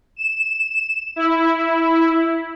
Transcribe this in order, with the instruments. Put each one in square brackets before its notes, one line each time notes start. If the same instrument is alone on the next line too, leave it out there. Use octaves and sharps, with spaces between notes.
[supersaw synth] E7
E4